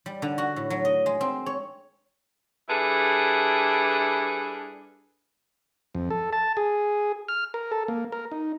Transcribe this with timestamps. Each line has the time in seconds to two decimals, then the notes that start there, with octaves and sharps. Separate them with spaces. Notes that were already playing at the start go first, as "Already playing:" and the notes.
0.06 G3
0.22 D3
0.38 F#4
0.56 A2
0.70 F#3
0.85 D#5
1.06 G#3
1.21 C4
1.46 C#5
2.69 G3 D4 E4 G#4 A4 B4
5.95 F2
6.10 A4
6.33 A5
6.57 G#4
7.28 F6
7.54 A#4
7.72 A4
7.88 A#3
8.12 A#4
8.32 D#4